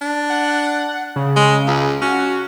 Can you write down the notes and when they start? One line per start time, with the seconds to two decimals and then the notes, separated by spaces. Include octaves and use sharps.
0.01 D4
0.30 F#5
1.16 C#3
1.36 G#3
1.67 C#2
2.02 C#4 F#4